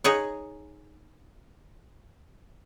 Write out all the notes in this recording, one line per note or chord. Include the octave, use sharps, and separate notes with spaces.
D#4 G#4 C#5 F#5